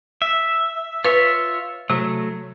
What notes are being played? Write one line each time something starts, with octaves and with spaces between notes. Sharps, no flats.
E5
F4 B4 C#5 E5
C3 F#3 A3